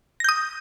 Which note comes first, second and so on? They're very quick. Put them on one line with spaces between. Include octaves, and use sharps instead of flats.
A#6 G6 D#6